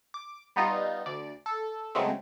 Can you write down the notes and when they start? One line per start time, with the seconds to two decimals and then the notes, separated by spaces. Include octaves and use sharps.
0.14 D6
0.56 G3 B3 D#4 F4
1.06 D2 D5
1.46 A4
1.95 C#3 F#3 G#3 A3 B3 C4